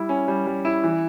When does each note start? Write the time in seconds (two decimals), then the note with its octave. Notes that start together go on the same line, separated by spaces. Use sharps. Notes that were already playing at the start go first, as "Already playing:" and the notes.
Already playing: G3 E4
0.09 C#4
0.28 G3
0.47 G3
0.65 E4
0.84 E3